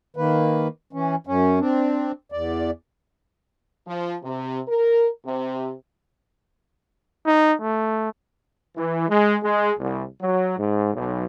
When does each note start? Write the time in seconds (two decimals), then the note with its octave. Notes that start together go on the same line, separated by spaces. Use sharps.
0.16 D#3 A#3 B4
0.93 E3 C#4
1.27 F#2 C#4
1.60 C4 D4
2.32 E2 D5
3.87 F3
4.24 C3
4.68 A#4
5.26 C3
7.26 D#4
7.61 A3
8.77 E3
9.09 G#3
9.43 G#3
9.79 C2
10.21 F#3
10.58 G#2
10.94 B1